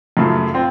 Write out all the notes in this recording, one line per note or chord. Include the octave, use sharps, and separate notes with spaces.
F#2 C#3 F3 A3
C4 F4